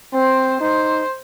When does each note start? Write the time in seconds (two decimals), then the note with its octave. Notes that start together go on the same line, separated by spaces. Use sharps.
0.13 C4 C5
0.61 D#4 C5